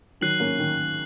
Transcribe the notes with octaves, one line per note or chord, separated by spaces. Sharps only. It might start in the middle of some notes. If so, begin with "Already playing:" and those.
D#3 F#3 F#6 C7 F#7
A#3 C#4
D#3